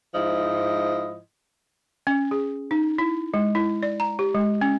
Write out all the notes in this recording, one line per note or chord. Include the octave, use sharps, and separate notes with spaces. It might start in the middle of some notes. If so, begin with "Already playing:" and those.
G#2 F3 E4 D#5
C#4
G#4
D#4
E4
G#3
E4
D5
A#5
G4
G#3
C#4